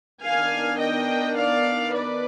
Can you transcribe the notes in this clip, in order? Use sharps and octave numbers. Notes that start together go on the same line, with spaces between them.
D#3 B3 D4 F5 G#5
D#5 G5
D5 F5
B4 D5